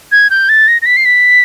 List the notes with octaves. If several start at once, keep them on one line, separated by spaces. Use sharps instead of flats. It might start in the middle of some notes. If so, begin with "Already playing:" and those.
G#6
G6
A6
A#6
A#6
B6
C7
B6